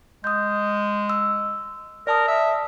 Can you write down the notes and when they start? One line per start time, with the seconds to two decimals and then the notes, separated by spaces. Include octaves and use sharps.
0.24 G#3 D#6 G6
1.10 E6
2.07 A#4 D5 A5 D#6
2.28 E5